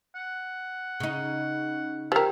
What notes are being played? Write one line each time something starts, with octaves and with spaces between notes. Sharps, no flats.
F#5
C#3 D#4
F3 G4 A#4 E5 G5